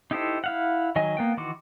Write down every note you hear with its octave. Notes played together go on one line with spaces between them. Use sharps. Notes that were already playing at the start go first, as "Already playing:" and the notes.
D#4 E4 G4 A4 C5
E4 F5 F#5
D#3 F#3 D#5 G#5
A#3 B3 G5
D#3 E3 F#4 C6 D6